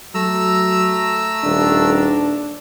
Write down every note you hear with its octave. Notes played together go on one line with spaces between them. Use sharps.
F#3 A3 A#5 E6
D#1 D4